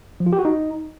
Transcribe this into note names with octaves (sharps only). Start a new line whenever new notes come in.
F3
F4
G4
F#4
D#4